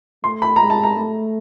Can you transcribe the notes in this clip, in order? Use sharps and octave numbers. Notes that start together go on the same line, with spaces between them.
A3 C6
B5
G#3 A#5
A5
A#5
A3